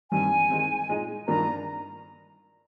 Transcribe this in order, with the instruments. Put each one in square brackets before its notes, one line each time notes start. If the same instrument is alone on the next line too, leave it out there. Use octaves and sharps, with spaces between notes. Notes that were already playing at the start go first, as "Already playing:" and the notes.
[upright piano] G2 D#3 G3 C4 [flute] G#5
[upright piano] D#3 G#3 C4
A#2 G#3 D#4
[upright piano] G2 D#3 A#3 D4 F4 [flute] A#5